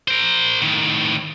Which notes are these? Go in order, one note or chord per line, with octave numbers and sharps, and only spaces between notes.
A#4 C5
A2 D#3